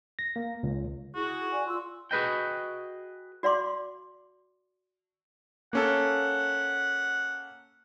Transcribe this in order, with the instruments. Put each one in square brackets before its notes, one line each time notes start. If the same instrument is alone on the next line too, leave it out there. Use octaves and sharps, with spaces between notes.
[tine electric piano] A#6
A#3
C#2
[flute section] E4 G#4 [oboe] F#4
[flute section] D5 G#5
F4 C6 E6
[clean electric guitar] F#4 G#4 B4 D#5 G5
[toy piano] F#4 D5 F5 C6 D6
[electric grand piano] A#3 C#4 A4 [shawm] F#5